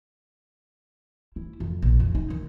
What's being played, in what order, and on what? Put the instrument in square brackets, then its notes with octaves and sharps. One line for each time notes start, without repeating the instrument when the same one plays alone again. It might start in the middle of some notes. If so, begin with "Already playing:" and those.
[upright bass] E4
F2
A#1
F2
D#4
D#3